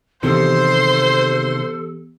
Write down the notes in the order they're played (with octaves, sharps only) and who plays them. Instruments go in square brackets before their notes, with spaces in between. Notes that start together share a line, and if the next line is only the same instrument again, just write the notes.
[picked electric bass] C3 D#3 [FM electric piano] E3 B3 G4 [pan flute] A4 [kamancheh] C5 C6